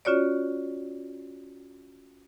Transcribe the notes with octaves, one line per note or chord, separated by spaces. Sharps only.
C#4 F4 F#4 C#5 D5